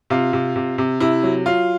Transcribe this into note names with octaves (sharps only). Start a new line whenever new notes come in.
C3 F4
C3
C3
C3
C3 E4
F#3
F#3 F4